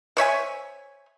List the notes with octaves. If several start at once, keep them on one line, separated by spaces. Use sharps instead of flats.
C5 C#5 E5 G#5